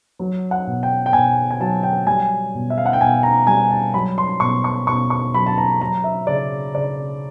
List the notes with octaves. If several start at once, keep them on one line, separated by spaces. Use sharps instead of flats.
F#3
F#5
B2
G5
G5
B2 G#5
G#5
F#3 A5
G5
G3 G#5
B2
E5
F5
F#5
G5
B2 G#5
A#5
G3 G#5
A5
F#3 B5
C6
B2 C#6
C#6
B2 C#6
C#6
F#3 B5
A5
A#5
F#3 A#5
E5
C#3 D5
C#3 D5